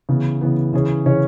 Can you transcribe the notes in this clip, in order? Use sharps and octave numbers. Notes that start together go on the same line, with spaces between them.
C#3 E3 B3
C#3 E3 B3
C#3 E3 C#4 G#4 C#5
C#3 E3 C#4 G#4 C#5